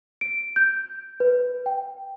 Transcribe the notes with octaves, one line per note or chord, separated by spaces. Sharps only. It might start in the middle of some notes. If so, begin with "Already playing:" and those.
D7
G6
B4
G5